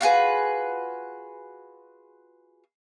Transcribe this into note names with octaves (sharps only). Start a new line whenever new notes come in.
F4 F#4 G#4 B4